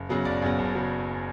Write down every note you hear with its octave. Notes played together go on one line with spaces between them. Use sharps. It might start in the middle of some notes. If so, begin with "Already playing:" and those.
Already playing: F#1
F#2 C#3 F#3 B3
F#1 D5
F#2 C#3 F#3 B3
F#1
C#3 F#3 B3